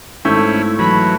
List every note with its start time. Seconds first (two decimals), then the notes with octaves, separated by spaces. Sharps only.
0.25 G#1 A3 C#4 E4 G6
0.79 E3 F#3 B5